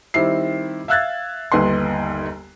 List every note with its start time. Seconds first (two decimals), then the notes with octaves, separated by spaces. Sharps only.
0.14 D#3 G3 C4 E4 C7
0.88 E5 F5 E6 F#6 G#6 A6
1.52 G1 D#2 B4 D#5 C6